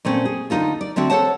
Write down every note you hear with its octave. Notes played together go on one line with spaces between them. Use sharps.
A#2 A3 C4 C#4
G#4
D2 A#2 D#4 F4 A4
D5
D3 A3 C4 F#4
A4 C5 C#5 F#5 A5